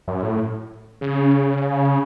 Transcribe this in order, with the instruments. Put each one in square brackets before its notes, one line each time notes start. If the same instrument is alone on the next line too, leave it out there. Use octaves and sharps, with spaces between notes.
[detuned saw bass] F#2
A2
C#3